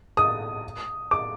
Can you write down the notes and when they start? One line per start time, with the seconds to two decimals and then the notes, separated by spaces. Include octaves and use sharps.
0.17 D#6
1.11 D6